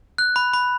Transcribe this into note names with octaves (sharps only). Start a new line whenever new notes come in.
F#6
B5
B5